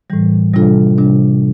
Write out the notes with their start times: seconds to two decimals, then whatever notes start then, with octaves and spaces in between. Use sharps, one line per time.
0.10 A2 E3 G3
0.54 C3 G3 D4 F4 A4
0.98 C3 G3 D4